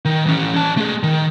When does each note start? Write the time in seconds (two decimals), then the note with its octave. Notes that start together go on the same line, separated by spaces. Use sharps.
0.05 D#3
0.26 E3 C#4
0.54 C#4 A5
0.78 A3 G#4
1.03 D#3